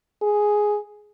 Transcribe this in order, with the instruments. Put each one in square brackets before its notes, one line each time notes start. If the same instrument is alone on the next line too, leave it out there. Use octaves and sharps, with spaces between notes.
[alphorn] G#4